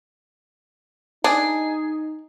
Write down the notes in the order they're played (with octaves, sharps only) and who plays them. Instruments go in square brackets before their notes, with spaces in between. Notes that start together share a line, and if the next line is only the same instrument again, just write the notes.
[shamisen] D4 [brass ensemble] D#4 [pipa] G#4